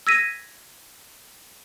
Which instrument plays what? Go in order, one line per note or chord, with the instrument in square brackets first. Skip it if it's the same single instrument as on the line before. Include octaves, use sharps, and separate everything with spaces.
[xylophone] E6 G#6 A#6 B6 D#7